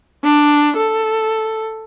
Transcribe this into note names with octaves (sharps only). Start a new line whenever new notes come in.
D4
A4